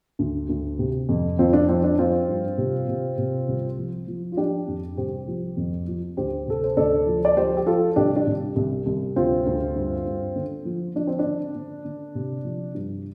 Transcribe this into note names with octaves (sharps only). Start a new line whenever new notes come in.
D2
D2
C3
F2
F2 C4 F4
D4
F3 C4
D4
F3 C4 F4
G2
C3
C3
C3
C2
F3
F3
F4
F3 D4 G4
F2
C2 G4 C5
F3
F2
F3
D2 G4 C5
C3 A4
C5
D2 A4 D5
F3
D5
F3 G4 C5
G4
F3 F4 A4
C2 D4 G4
D4
C2
C2
C2
D2 C4 F4
D2
G2
G2
D3
F3
F3 D4
C4
D4
D3
D3
D3
C3
F3
G2